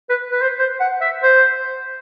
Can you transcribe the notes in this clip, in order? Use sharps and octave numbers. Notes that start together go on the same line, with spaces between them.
B4
B4
C5
C5
F#5
E5
C5